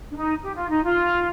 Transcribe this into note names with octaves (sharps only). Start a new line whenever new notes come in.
D4
D#4
G4
F4
D#4
F4